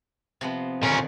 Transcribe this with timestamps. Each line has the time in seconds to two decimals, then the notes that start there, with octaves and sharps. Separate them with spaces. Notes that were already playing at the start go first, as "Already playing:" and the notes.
0.41 C3 F3 B3
0.83 A#2 D3 D#3 C#4